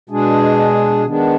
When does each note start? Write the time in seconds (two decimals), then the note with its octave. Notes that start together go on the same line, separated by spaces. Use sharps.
0.10 B2 G#3 D4 G#4
1.05 D#3 G#3 B3 D4